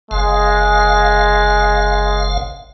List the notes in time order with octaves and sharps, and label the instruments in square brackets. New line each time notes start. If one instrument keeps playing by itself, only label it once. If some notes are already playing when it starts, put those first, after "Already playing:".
[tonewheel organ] F#1 F5 [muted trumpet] G#3